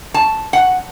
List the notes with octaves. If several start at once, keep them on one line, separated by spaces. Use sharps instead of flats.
A5
F#5